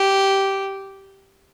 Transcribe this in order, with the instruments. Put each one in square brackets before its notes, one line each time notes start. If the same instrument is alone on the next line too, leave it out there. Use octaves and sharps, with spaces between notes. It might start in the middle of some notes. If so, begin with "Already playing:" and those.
Already playing: [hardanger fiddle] G4